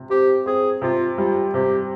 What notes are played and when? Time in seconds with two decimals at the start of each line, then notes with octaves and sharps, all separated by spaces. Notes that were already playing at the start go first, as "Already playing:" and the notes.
Already playing: C3
0.10 C4 G4
0.46 C4 G#4
0.82 C3 F4
1.18 G3 F4
1.54 C3 G4